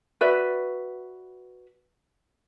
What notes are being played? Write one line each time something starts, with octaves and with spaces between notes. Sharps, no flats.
F#4 B4 D5 E5